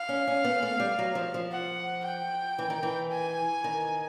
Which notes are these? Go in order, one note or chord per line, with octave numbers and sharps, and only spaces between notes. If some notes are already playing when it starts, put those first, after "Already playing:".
Already playing: F5
C#4
C#4
B3
A3
G3
F#3
F3
F3
F#5
G5
E3
D#3
E3
G#5
D#3